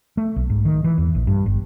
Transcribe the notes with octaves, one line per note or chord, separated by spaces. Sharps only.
A3
B1
G#2
D#3
E3
E2
A#1
G2
G1